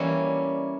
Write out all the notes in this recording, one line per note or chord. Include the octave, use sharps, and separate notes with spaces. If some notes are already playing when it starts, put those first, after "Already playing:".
Already playing: E3 G3 A#3 C#4 D5